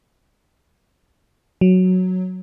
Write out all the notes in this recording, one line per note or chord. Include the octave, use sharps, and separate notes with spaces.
F#3